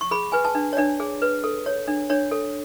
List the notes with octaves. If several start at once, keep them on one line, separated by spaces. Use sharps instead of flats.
C#6
G#4 B5
B4 G#5
A5
D4
C#5
D4 D5
G#4
B4
A4
C#5
D4
D4 C#5
A4